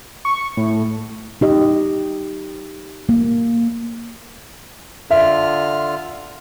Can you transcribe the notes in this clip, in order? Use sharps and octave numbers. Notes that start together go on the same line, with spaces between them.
C#6
A2
D#4 G4 D#5
A#3
D3 F4 E5 F6